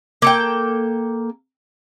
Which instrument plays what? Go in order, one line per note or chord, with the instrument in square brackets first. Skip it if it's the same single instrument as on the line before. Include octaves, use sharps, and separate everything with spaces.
[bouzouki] A#3 A4 G5